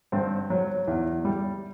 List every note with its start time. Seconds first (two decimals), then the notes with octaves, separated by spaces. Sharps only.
0.12 G2 C4
0.50 F#3
0.87 E2
1.25 G3